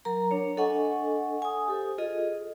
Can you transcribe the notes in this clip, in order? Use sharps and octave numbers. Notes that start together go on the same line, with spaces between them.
F#3 A#4 A#5
D4 C#5
D4 A4 D#5 F#5 G#5 C#6
G#5 D#6
G4 A4 C5
F4 G#4 A4 D#5